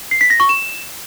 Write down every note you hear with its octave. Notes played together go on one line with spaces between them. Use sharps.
C7
B6
A#6
C#6
E7